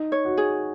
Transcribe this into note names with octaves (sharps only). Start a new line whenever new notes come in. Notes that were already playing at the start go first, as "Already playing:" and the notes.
Already playing: D#4
C#5
F#4
G#4